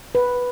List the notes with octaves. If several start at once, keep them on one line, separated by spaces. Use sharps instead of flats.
B4